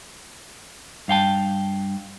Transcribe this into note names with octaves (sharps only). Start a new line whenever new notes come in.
G2 F5 G5 A5